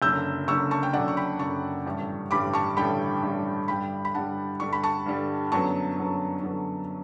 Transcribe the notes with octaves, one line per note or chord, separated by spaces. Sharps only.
F#1 F#2 D3 E6 G6
F#1 F#2 D3 C#6 E6
A5 C#6
G5
F#1 F#2 D3 D5 F#5
C#6
G5 B5
F#1 F#2 D3 A5 C#6
A1 G2 D3 G3
A1 G2 D3 G3 B5 D6
A5 C#6
A1 G2 D3 G3 G5 B5
A1 G2 D3 G3
G2 D3 G3 G5 B5
B5
G2 D3 G3 F#5 A5
G2 D3 G3 C#6
B5
A5 C#6
G2 D3 G3
F#2 D3 F#3 B3 A5 C#6
F#2 D3 F#3 B3
F#2 D3 F#3 B3